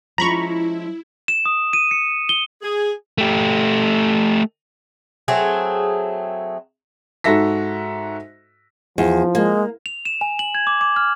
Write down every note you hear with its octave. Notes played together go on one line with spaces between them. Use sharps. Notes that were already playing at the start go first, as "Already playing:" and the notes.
F3 G#3 C#4 E4 A#5 B5 C#6
E7
D#6
D#7
C#7
G7
G#4
A3 G4
F#3 A3 C4 G#4
G#2 F#4 A4 E5 A#6 B6
E2 F3
G#3 A#3
F7
E7
G#5
F#7
G#6
D6
D6
F6